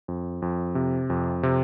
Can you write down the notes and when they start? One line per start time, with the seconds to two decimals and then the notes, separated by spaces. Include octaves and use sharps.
0.08 F2
0.42 F2
0.75 C3
1.10 F2
1.43 C3